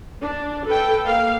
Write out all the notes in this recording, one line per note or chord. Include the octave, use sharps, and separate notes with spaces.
D4
A4 B4 G5
A#3 F5